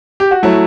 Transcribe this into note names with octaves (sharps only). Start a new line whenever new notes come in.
G4
F#4
F#3 A3 E4